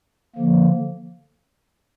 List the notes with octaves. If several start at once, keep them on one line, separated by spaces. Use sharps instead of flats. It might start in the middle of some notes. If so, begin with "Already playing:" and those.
D3 F3 A#3